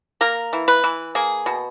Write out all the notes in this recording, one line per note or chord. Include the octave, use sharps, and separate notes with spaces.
A#3 A#4
E3
B4
E3
A#3 G#4
B2